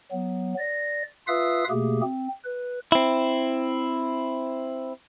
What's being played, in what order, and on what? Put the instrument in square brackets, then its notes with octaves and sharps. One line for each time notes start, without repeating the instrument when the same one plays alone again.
[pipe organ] F#3 B3
D5 A#6
F4 B4 E5 F5 D#6 E6
B2 A3 A#3 G4 G#4
C4
B4
[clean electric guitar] C4 E4